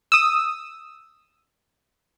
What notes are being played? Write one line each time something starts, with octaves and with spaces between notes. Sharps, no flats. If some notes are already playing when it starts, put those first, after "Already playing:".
D#6 E6